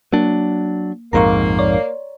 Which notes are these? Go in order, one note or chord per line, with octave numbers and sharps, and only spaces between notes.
F#3 A#3 D4
A#1 F2 G#2 A#3 A#5 C6 C#6
C#5 D5